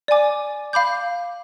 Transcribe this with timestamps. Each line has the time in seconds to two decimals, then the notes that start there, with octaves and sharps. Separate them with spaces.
0.08 D5 G#5 D6
0.73 F5 B5 D6 G6